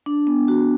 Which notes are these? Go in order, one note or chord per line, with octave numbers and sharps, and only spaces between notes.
D4
B3
F#4